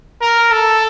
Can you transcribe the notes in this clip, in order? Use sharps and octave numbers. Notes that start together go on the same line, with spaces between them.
A#4
A4